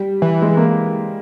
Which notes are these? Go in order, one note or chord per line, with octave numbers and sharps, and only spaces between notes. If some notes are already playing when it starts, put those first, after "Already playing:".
Already playing: G3
E3
G#3
A#3